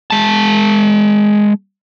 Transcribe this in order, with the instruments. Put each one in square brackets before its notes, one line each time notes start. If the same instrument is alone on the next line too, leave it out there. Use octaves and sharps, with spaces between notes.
[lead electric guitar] G#3 A5